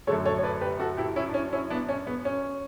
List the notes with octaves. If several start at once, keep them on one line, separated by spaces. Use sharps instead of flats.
F#2 D3 A3 A4 C#5
A4 C#5
C#5
B4 D5
G4 B4
F#4 A4
E4 G4
C#4 E4
D4
C#4
C#4 E4
B3 D4
C#4
B3
C#4